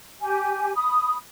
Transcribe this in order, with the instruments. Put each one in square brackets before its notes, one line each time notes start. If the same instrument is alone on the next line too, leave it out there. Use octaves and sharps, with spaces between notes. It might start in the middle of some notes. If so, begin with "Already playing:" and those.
[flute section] G4 G#5
B5 D#6